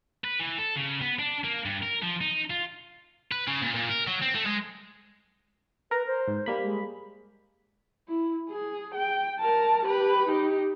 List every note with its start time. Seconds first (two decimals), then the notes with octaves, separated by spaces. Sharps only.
0.24 B4
0.39 E3
0.58 A4
0.76 C#3
1.01 B3
1.19 D4
1.44 A#3
1.66 G2
1.83 A#4
2.03 F3
2.21 D#4
2.50 F4
3.32 B4
3.47 C#3
3.62 A#2
3.75 A#2
3.89 A#4
4.07 F#3
4.22 C4
4.35 A3
4.46 G#3
5.91 A#4 B4 A#5
6.07 C5
6.28 G#2
6.46 G3 A#3 B5
6.63 G#3
8.08 E4
8.50 G#4
8.94 G5
9.39 A#4 A5
9.85 G4 B4
10.28 D#4 G4